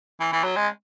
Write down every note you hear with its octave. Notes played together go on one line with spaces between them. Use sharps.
E3
E3
F#3
G#3